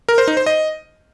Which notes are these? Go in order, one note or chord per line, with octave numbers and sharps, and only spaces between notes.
A#4
C5
D#4
C5
D#5